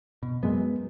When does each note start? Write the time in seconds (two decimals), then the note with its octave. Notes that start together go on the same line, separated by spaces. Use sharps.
0.23 B2
0.43 F#2 F#3 G#3 B3